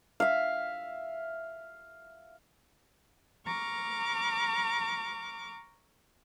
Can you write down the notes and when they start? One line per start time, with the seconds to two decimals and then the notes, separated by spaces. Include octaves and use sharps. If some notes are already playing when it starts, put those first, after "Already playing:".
0.20 E5 F5
3.45 A#5 C#6 D6 F6